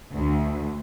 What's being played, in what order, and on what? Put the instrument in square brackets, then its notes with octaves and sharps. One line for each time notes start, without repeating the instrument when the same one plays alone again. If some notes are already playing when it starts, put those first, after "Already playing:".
[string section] D2